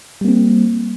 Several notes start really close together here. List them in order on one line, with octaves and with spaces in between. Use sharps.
G3 A#3 C4